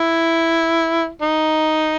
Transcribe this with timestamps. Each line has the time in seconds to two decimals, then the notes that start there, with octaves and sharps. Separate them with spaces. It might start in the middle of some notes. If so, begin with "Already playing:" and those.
Already playing: E4
1.22 D#4